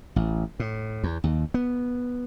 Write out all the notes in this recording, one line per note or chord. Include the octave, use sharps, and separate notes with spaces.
A1
A2
E2
D#2
B3